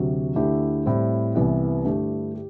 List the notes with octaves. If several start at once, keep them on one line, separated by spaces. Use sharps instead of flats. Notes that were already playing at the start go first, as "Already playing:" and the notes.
Already playing: D2 C3 F#3
D2 D3 A3 E4 G4
A2 G3 C4 E4
C2 C3 E3 B3 E4
G2 D3 A3 E4 G4
G4